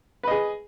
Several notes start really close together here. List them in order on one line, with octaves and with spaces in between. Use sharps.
B4 D#5 G#4